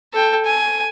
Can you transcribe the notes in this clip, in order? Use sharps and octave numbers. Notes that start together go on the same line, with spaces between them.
A4 G5
G#5